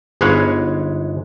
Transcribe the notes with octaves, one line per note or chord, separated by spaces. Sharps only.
G1 G#2 G#3 B4 C#5 F5